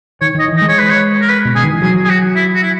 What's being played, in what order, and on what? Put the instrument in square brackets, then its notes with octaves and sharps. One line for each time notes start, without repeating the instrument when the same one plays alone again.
[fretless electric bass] D#3 [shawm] C#5
[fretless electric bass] D#3 [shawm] D#5
[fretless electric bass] E3
[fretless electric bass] G#3 [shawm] D#5
[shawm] C#5
B4
C#5
A#4
B4
[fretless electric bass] B2
[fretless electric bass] C#3 [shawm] G#4
[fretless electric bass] D#3
E3
[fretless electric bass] F#3 [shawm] G#4
[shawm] G#4
F#4
E4
F#4
E4